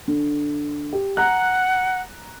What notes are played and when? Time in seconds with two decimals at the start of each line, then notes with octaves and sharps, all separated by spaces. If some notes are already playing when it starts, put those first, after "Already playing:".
0.08 D3
0.93 G4
1.17 F#5 A#5 F#6